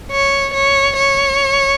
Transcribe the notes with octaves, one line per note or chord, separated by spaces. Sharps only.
C#5
C#5
C#5